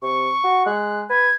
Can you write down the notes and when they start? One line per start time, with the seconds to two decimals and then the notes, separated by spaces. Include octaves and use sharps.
0.02 C3 C#6
0.44 F#4
0.66 G#3 F#6
1.10 B4 G#6